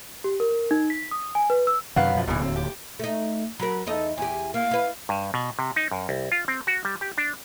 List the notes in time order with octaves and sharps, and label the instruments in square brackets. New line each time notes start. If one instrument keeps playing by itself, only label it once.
[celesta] G4
A#4
D#4
B6
D#6
G#5
B4
E6
[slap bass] F#2 C3 D#3 [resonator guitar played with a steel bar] B4 F5 F#5
[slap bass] F#2 B2 F3
[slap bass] D1 D#2 D3 [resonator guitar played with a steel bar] B2 E3
[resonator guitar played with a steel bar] C4
G4
[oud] A3 D#4
[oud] F#3 A#4 [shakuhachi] B5
[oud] E2 D#4 D#5 [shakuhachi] A4
[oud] E2 G4 [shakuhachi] G#5
[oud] A#3 [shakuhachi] F5
[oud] E4 B4
[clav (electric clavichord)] G2
B2
C3
D#4
F#2
C2
F4
C4
F#4
G3
G4
D4